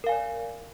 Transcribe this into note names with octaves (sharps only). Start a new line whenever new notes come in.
A#4 D5 F5 G#5